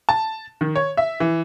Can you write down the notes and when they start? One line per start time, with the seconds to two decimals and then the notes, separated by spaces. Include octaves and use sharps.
0.09 A5
0.61 D#3
0.76 C#5
0.97 E5
1.20 E3